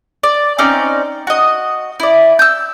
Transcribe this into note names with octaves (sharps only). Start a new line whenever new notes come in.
D5
C4 C#4 D#4 D5
F#4 D#5
E4 D5
E6 G6